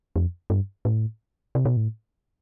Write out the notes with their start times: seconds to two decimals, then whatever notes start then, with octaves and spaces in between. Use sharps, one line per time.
0.16 F2
0.50 G2
0.85 A2
1.55 C3
1.65 B2
1.77 A2